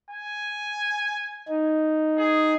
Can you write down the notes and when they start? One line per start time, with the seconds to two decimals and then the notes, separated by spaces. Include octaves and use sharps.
0.11 G#5
1.49 D#4
2.18 G#4